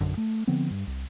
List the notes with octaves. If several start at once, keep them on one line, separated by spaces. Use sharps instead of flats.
A#1 F#2 D3
A3
D3 F3 B3 C4
G2
C2